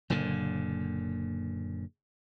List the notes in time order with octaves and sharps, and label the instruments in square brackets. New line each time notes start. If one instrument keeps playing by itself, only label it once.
[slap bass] F#1 A#2 D3